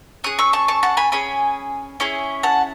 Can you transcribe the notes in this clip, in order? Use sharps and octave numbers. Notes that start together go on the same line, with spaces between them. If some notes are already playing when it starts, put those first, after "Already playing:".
C#4 G#4 D#6 F#6
C#6 E6
A5 C#6
A5 C#6
F#5 A5
G#5 B5
C#4 G#4 G#5 B5
C#4 E4 G#4
F#5 A5